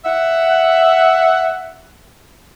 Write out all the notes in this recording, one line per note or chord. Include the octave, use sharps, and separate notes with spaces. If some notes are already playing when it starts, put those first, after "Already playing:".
E5 F#5